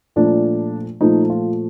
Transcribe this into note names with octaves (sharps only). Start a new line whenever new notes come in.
A#2 F3 A3 D4
A#2 F3 A3 D#4
F4